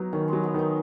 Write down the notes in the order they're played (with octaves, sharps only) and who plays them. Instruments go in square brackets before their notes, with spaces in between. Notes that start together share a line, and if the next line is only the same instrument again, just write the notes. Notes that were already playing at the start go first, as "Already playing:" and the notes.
Already playing: [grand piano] F#3 [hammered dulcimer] B3 D#4
[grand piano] D#3 [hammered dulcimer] C#4
[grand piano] F#3 [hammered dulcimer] G#3
[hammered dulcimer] B3
[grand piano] D#3 [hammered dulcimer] D#4